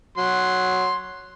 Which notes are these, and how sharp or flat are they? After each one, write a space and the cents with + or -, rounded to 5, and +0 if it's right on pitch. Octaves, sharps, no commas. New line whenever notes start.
F#3 +0 C6 +5